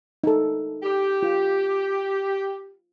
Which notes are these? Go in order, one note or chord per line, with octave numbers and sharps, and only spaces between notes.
D#4 A4
G4
F4